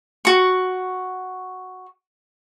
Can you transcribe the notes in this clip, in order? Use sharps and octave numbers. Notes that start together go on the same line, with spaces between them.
F#4 C#6